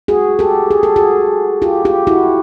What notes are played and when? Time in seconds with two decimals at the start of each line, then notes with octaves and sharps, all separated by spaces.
0.08 F#4 G#4
0.39 G4 A4
0.71 G#4
0.83 A4
0.96 F#4 G#4
1.62 F4 G4
1.85 F4 G4
2.07 E4 F#4